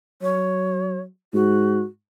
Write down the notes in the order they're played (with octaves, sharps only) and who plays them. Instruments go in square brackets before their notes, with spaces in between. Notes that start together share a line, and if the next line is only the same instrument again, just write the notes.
[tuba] F#3 [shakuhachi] C#5
[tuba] G#2 [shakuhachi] F#4